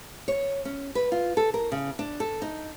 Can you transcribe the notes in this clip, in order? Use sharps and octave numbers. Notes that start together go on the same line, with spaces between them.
C#5
C#4
B4
F4
A4
A#4
C#3
D4
A4
D#4